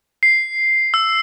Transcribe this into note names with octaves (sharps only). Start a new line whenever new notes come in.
C7
E6